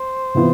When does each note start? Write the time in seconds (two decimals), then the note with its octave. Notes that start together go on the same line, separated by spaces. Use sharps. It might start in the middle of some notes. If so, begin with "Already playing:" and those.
Already playing: C5
0.35 C3 E3 B3 F4